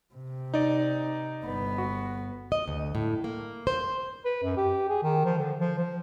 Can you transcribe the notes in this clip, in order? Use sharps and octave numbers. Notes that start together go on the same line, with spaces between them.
C3
D#4 D5
G1 B3
F#4
D#5
D2
A2
A#3
C5
B4
F#2
G4
G#4
D#3
F3
D3
F3
F3